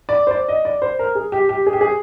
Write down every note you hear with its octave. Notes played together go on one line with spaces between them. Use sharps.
D5
C5
D5
D#5
D5
C5
A#4
G#4
G4
G4
G#4
G4
G#4